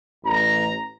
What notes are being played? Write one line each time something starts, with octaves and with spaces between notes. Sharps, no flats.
A1 A#5